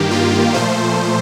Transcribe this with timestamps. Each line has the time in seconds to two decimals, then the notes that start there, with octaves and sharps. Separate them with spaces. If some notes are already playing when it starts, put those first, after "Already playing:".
Already playing: G2 D#3 A#3 G4
0.11 F4
0.54 A#2 F3 A3 C5